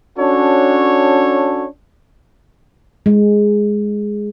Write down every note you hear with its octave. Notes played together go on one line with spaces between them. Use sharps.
C#4 D4 F#4 A4 C#5
G#3